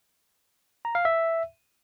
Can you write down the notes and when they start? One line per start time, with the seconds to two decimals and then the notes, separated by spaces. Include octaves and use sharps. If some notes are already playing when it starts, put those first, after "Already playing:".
0.85 A#5
0.95 F5
1.05 E5